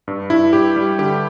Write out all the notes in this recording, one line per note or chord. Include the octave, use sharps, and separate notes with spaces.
G2
G2 E4
G2 G4
G3
D3 G4